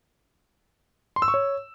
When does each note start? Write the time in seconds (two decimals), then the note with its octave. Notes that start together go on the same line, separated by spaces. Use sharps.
1.16 C6
1.22 E6
1.28 C#6
1.34 C#5